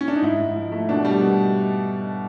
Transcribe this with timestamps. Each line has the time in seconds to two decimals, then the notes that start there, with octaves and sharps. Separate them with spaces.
0.01 C#4
0.08 D4
0.15 D#4
0.22 G#2 E4
0.39 G#2
0.55 F3
0.72 A3
0.89 B2 D4
1.05 G3
1.21 B2